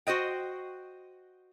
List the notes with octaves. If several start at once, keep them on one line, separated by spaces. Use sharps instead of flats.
F#4 C5 D#5 G5